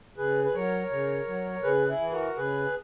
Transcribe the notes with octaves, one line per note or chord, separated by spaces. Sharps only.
C#3 G#4 B4
B4
F#3 A#4 C#5
C#3
F#3
C#3 G#4 B4
E4 G#4
E3
F#4 A#4
C#3 G#4 B4